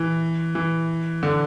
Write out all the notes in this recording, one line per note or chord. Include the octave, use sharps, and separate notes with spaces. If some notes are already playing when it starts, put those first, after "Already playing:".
Already playing: E3
E3
D3